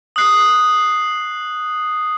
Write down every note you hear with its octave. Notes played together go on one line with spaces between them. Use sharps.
D#6 F#6 C7